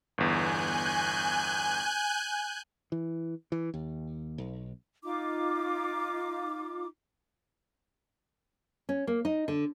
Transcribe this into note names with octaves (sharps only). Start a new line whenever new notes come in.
G1 E2 G#5 F#6 G6
E3
E3
D#2
B1
D#4 F4 D6
C#4
A#3
D#4
D3